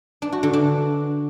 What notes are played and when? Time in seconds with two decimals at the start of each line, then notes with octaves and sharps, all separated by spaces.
0.22 D4
0.32 F#4
0.43 D3
0.53 D4